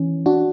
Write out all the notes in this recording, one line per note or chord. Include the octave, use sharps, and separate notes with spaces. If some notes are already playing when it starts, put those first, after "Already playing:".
Already playing: E3 C#4
D4 F#4